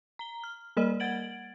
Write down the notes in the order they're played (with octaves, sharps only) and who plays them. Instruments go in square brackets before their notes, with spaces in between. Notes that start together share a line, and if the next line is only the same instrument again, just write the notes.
[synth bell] A#5 G7
F6
G3 A#3 A#4 D5 D#5 F6
F#5 G#6 A6 D7 F#7